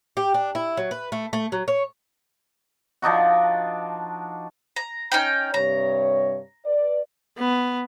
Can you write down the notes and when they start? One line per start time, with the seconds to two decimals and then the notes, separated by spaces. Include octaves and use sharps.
0.17 G4
0.34 D4
0.55 E4
0.77 F#3
0.91 B4
1.12 A3
1.33 A3
1.52 F#3
1.68 C#5
3.02 F3 D4 D#4 F#4
4.76 A#5
5.12 C#4 D#4 G5
5.54 G2 C3 C#5 A#5
6.66 B4 D5
7.38 B3